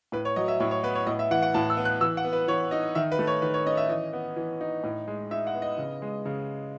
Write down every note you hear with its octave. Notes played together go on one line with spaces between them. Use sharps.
A2 B4
C#5
F#3 D#5
E5
A2 C#5
C#5
B3 B4
C#5
A2 D#5
E5
E3 F#5
F#5
A2 A5
E6
B3
F#6
E3 E6
F#5
B3
B4
E3 C#5
D#4 D#5
D#3 E5
B4
A3
C#5
D#3 B4
C#5
C#4 D#5
E5
E3 D#5
B3
E3
D#4
A2
G#3
D#4 E5
F#5
B3
D#5
C#3
G#3
C#3